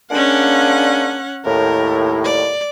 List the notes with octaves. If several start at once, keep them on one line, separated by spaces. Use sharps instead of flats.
G#3 A#3 C#4 D4 F#5
D#2 A2 A#4
D5